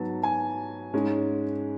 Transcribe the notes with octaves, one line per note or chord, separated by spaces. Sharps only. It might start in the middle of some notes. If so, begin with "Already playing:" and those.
Already playing: G#2 F#3 B3 A5
G#5
G#2 G#3 C#4